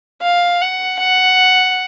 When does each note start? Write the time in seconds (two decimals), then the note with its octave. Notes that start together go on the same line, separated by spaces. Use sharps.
0.21 F5
0.61 F#5
0.99 F#5